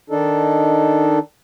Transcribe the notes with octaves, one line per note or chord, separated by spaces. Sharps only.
D#3 D4 D#4 A4